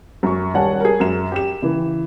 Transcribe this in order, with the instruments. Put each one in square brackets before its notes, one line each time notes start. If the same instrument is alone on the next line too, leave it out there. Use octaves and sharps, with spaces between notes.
[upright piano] F#2 C#6
D#1 G3 C#5 F#5 G#5 A5
G#4 A#4
F#2 E7
G4 E7
C#3 E3